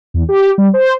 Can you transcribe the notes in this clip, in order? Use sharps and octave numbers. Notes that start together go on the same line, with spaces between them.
E2
G4
G3
C5